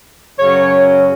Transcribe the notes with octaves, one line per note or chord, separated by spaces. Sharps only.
F#2 C#3 F#3 C#4 C#5